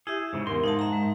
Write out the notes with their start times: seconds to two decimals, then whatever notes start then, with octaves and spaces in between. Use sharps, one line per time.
0.07 E4 G4 G#4 E5
0.33 G#2 C#3
0.47 E2 A#4 C6
0.64 G#2 D#4 F5 A5
0.79 E5 A#5
0.93 G#3